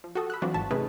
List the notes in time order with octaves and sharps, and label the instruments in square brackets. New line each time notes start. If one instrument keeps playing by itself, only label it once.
[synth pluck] F3
F#4 G4 A4 D#6
B5 E6 F#6
E3 F#3 C4 D4 F4 F#4
G#1 A5 C#6 B6
C3 A3 C#4 D#4 G#4 B4